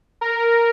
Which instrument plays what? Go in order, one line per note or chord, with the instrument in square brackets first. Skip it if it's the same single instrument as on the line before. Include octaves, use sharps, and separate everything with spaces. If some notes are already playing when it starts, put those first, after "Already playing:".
[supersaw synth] A#4